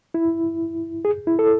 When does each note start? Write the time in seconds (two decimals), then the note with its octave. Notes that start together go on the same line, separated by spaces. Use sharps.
0.14 E4
1.05 G#4
1.27 E4
1.39 A4